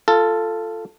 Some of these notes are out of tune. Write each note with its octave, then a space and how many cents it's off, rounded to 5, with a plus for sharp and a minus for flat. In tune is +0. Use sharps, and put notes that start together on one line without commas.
F4 -10 A4 +5